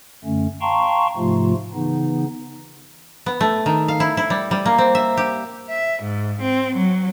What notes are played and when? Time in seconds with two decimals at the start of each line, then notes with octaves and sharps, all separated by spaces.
0.25 F#2 D3 A3 C#4
0.61 F5 G5 A5 A#5 C6 C#6
1.17 G#2 C3 F3 A3 F4
1.74 C#3 E3 B3 D#4
3.26 B3
3.41 A3
3.66 D#3
3.88 F5
4.00 E4
4.17 E4
4.30 G3
4.51 G3
4.66 A#3
4.78 C4
4.95 E5
5.17 G4
5.69 E5
6.02 G#2
6.42 C4
6.75 F#3